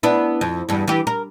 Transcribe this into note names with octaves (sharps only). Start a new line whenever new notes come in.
B3 D4 E4
F2
E2 G2
E3 G4
A#4